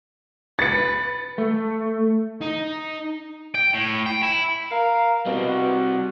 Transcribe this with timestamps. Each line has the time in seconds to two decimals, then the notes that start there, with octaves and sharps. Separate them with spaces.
0.59 B4 A6 C#7
1.38 A3
2.42 D#4
3.55 G5
3.74 A2
4.06 G5
4.23 E4
4.71 A#4 F5
5.26 B2 G3 C4
5.48 F#4